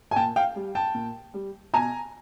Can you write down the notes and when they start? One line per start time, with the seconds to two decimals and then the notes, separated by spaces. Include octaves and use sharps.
0.11 G#5
0.16 A#2 G5 A5
0.36 F5 G5
0.56 G3
0.75 G5 A5
0.95 A#2
1.34 G3
1.73 B2 G#5 A#5